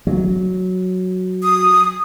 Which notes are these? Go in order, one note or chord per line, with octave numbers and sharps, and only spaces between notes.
F#3
D#6